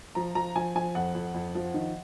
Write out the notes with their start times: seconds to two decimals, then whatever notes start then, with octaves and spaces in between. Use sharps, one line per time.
0.15 F3 A#5
0.35 F3 A#5
0.55 F3 G#5
0.75 F3 G#5
0.95 F2 F#5
1.15 F2
1.34 F2
1.55 F3
1.74 D#3